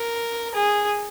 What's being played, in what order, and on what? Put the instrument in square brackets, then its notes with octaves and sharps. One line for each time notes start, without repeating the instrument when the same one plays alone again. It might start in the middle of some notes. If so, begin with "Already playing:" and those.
Already playing: [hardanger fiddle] A#4
G#4